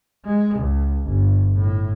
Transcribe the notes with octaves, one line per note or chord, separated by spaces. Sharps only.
G#3
C#2
G1
A2